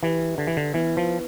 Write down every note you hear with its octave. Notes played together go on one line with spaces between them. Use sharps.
E3 G4 B4 E5
D3
E3
D3
E3 B3 E4 B4
F3